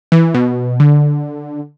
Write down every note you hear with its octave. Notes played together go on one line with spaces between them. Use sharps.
E3
B2
D3